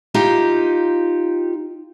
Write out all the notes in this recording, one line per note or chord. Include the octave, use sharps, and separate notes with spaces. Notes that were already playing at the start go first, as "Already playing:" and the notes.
D#4 F4 G4